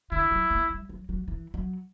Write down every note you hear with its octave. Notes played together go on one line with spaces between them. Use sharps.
D3 E4
F#3
A#3
G3
F#3
F#3
E3
F#3